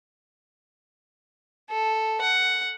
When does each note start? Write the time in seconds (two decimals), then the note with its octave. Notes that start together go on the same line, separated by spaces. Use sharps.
1.70 A4
2.21 F#5